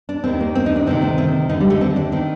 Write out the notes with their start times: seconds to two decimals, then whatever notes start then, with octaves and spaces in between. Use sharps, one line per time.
0.09 D4
0.24 D#2 D#3 C4
0.41 A#3
0.55 C4
0.66 D#4
0.76 D4
0.86 D2 C3 D#3 C4
1.02 A3
1.18 C4
1.49 D#2 D3 D#4
1.61 G3
1.70 A3
1.81 C4
1.96 D4
2.12 D#3 C4